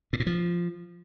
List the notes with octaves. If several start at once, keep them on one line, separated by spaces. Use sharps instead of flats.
A2
A#2
F3